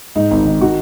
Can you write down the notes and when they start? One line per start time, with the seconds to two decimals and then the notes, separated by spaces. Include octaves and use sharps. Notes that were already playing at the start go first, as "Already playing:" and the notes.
0.16 G#2 D#4
0.31 G#1
0.45 D#3
0.61 D#3 F#4